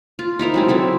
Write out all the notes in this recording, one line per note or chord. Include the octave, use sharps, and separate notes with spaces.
F4
D#4 E4 A#4 C5
F#3 G#3 C4
F#3 C4 E4 A4